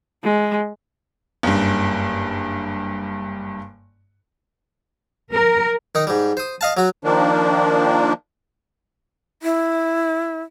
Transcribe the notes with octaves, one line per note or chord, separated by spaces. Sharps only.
G#3
F#1 G2
A#4
D#3 D#4
G#2 G3
C5 D#6
D#5 F5 A5
F#3 F#4
D#3 F3 A#3 D4
E4